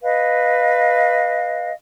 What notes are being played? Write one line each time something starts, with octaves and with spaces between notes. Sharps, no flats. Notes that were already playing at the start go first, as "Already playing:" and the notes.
B4 D#5 F5